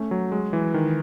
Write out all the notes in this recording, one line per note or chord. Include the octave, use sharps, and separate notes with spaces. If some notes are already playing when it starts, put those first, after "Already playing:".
Already playing: A3 C#4
F#3
G#3
E3
D#3